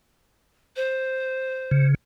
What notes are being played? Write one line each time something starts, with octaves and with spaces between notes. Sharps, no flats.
C5
C#3